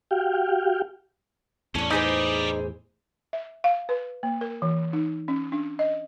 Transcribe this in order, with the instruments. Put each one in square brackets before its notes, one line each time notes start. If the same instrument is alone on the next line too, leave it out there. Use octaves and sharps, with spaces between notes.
[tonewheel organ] F#4 G4 F5 G5
[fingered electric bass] E2 A2 [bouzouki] A3 D4 [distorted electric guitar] C#4
[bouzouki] E3 G#4 C5 [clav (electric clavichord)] D#4 [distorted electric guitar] D5 B5
[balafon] E5
F5
B4
A#3
A#4
E3
D#4
C#4
D4
D#5